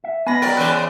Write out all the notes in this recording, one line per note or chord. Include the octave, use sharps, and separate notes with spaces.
E5
B3 D#5 G#5 B5 A#6
F#3 A#4 D5 D#5 G5
C#3 E3 C5 F#6